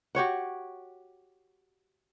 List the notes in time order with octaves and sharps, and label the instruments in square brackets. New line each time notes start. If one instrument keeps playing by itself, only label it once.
[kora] F#4 G4 C#5 F#5